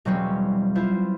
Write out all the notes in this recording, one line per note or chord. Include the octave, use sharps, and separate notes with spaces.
E1 F#3 G3 C4 C#4
E4 F4 C5